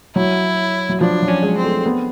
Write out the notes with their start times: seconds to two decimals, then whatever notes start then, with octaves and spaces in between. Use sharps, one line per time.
0.16 F#3 E4
0.89 F#3
1.01 F3 D4
1.22 F#3
1.28 C#4
1.43 G#3
1.58 C4
1.64 A3
1.85 B3